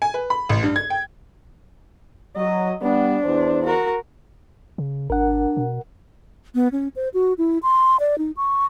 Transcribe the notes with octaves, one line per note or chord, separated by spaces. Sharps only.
G#5
B4
B5
A1
G2
G#6
G5
F#3 D#5
G3 B3 D4
E2 C5
F#4 A#4
C#3
G#1 D4 A#4 F#5
B2
B3
C#4
C5
F#4
E4
C6
D5
D#4
C#6